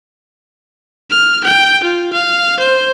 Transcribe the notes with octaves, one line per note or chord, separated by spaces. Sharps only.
F6
G5
F4
F5
C5